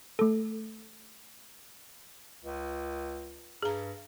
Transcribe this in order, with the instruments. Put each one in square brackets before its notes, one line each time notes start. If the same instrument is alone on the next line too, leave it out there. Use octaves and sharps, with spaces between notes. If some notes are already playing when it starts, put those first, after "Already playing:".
[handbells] A3 A4
[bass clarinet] C#2
[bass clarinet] G2 [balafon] G#4 A#5